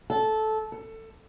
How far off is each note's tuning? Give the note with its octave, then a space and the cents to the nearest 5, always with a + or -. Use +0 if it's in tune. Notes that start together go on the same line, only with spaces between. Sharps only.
A4 -15
A4 +20